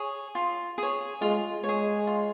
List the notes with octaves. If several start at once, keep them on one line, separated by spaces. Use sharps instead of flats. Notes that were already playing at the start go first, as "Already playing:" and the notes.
Already playing: G#4 C#5
F4
G#4 C#5
G#3 F4
G#3 C#5
G#4
F4